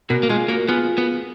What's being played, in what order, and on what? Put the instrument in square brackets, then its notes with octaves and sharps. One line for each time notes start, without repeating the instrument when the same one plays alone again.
[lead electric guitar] B2 [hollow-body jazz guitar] F#4 A#4
[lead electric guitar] A#3
[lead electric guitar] G#3 [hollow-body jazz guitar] F4 G#4
[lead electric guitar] A#3 [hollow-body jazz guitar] F#4 A#4
[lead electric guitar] B3 [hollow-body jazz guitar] F4 G#4
[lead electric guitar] B3